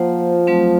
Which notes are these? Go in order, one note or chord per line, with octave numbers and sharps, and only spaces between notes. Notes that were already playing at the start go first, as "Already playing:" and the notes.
Already playing: F3 A#3 F4 C5 F#5
F#3 A3 C4